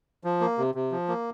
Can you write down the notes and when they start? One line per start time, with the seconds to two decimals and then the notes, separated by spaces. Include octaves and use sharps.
0.24 F3
0.41 A#3
0.58 C3
0.75 C3
0.92 F3
1.08 A#3